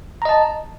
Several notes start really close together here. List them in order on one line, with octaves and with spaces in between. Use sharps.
A#5 D#5 A5